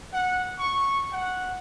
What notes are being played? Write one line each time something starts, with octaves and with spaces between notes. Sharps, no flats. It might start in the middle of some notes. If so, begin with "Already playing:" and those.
F#5
C#6
F#5